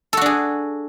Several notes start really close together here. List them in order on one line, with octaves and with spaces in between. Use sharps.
A4 F#4 D4 G#4